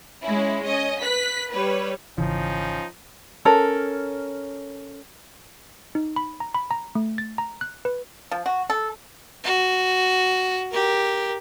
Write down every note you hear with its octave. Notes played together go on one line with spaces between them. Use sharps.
G#3 C#4 E4
C#4 D#5
B4 F#6 B6
G3 B4 C#5
G#1 C#3 E3 F3 C#4 D#4
C#4 A4 A#4
D#4
B5
A#5
B5
A#5
A3
A6
A#5
F#6
B4
F3
F#4
A4
F#4
G4 A#4